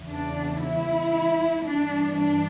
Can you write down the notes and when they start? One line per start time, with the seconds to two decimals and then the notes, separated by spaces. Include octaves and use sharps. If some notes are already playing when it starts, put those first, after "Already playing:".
Already playing: E2 C#3 E3
0.09 D4
0.61 E4
1.64 G2 E3 D4
2.15 D4